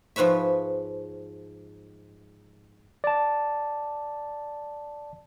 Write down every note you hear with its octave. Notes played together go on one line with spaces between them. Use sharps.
G#2 F3 B4 C#5 E5
D5 A5